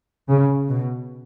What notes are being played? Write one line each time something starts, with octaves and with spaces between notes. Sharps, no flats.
C#3
B2